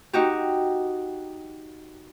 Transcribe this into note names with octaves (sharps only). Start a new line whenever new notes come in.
D#4 F#4 G4